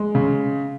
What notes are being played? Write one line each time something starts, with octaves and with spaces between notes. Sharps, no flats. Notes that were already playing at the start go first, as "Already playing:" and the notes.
Already playing: G#3
C#3